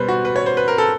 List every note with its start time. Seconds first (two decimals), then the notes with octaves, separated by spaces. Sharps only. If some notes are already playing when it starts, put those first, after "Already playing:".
Already playing: B2 G3 B4 C5
0.08 F#4
0.25 B4
0.36 C#5
0.46 C5
0.57 B4
0.68 A#4
0.78 A4